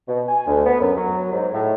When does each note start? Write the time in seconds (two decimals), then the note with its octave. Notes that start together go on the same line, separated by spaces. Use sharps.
0.08 B2
0.28 G#5
0.47 D2
0.66 B3
0.81 F#2
0.96 F#3
1.33 G#2
1.53 A2